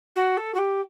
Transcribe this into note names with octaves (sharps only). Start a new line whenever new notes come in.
F#4
A4
F#4
G4